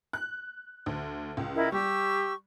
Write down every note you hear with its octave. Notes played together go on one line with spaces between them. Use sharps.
F#6
D2
C#2
E4 A#4 D#5
G3 G4 C#6 E6